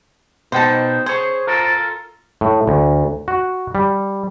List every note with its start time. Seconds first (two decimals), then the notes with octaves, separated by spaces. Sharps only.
0.52 B2 D#4 C5 G5 A5
1.06 G#4 C5 C#5
1.47 F4 A4 A#4
2.41 A2
2.67 D2
3.28 F#4
3.75 G3